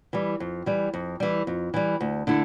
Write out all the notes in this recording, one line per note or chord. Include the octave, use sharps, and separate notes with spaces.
E3 G3
F2
E3 G3
F2
E3 G3
F2
E3 G3
D2
D3 A3 E4